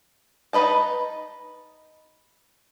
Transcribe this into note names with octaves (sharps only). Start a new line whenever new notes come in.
D#4 F4 B4 D#5 A5